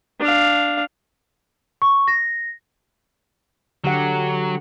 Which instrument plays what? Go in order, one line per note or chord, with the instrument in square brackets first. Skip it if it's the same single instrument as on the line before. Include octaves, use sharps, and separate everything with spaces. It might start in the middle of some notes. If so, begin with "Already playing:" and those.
[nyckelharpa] D4 F5
[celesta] C#6
A#6
[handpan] D3 G4 F#5 [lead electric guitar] F#3